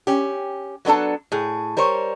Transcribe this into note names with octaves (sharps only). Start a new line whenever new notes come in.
C#4 G4
F#3 B3 D4 A4 A5
A2 G#4
G3 A#4 C5 C#5